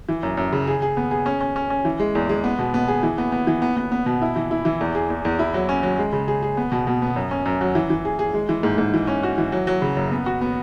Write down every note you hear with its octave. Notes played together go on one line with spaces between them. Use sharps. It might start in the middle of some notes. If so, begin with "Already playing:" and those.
E3
F#2
F#2
C#3
G#4
G#4
B3
G#4
C#4
C#4
C#4
C#4
E3
G#3
E2
G#3
B3
B2
B3
G#4
E3
B3
B3
E3
B3
B3
B3
B2
E4
E3
E4
E3
E2
G#4
E2
E2
E4
F#3
C#4
F#3
G#3
C#3
G#4
G#4
B3
B2
B2
B3
F#2
C#4
F#2
F#3
E3
E3
G#4
G#4
G#3
E3
G#2
G#2
E3
C#4
F#4
E3
F#3
F#3
C#3
F#2
B3
F#4
B3